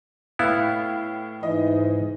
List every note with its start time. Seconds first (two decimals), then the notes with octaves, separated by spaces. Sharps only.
0.39 A2 B3 E4 F5
1.43 G#2 E3 D#5